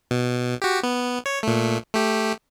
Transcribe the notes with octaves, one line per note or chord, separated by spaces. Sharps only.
B2
F#4 G4
B3
C#5
A#2 A3
A3 G4